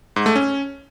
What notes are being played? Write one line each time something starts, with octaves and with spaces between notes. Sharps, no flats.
G#2
A3
C#4